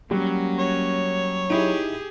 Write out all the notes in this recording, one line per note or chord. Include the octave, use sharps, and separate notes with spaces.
F#3 G3 A#3 C#4
C#5
D#4 E4 G4 G#4